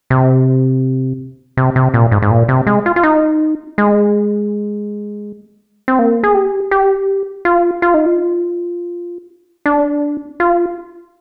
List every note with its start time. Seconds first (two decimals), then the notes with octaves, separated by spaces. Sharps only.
0.10 C3
1.57 C3
1.76 C3
1.94 A#2
2.11 G#2
2.22 G#2
2.31 A#2
2.49 C3
2.67 G#3
2.86 F4
2.96 F4
3.03 D#4
3.78 G#3
5.88 C4
5.99 A#3
6.24 G#4
6.35 G4
6.71 G4
7.45 F4
7.82 F4
7.94 D#4
8.06 F4
9.66 D4
10.40 F4